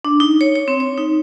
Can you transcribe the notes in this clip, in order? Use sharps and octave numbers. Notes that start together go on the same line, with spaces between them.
D4
D#4
C#5
C#5
C4
C#5
D#4